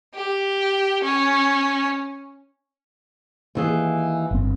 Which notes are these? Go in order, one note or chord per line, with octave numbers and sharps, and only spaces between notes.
G4
C#4
D#2 E3 G#4
G1 C4